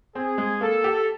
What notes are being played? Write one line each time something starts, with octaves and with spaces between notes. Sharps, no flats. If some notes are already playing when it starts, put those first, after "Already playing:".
C4 G#4
G#3
A#3 A4
G4